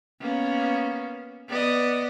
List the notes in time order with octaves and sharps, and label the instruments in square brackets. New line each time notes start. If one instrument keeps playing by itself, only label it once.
[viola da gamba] A#3 B3 C#4
B3 D5 D#5